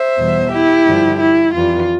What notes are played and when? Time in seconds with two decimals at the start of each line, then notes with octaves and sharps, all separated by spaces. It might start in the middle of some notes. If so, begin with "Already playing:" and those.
Already playing: C5 E5
0.17 E2 B2 G3
0.51 E4 G4
0.85 G2 D3 F3
1.19 E4
1.53 F2 E3 G3 F4